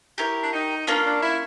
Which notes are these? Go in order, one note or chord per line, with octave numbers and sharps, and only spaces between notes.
E4 G4 A#4 C#5
D4
D#4
A#3 C#4 D4 F4
D4
E4